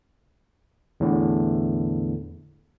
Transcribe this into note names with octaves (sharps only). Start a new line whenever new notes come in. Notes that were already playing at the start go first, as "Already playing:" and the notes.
E2 A2 D3